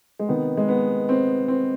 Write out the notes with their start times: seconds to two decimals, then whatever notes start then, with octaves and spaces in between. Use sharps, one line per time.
0.19 G#3
0.29 C3 D#3 B3
0.57 G#3
0.68 B3
1.09 C4
1.48 C4